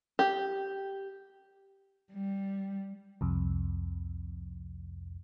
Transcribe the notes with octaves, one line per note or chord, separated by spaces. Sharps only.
G4
G3
C2 F2